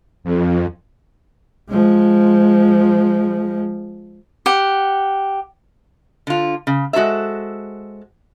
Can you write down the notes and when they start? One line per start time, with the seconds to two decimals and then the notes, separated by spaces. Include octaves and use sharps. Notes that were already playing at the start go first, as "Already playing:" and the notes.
0.24 F2
1.70 F3 G#3
4.46 G4 F#5
6.27 D3 F4
6.67 C#3
6.93 G#3 F#4 A4 C5 E5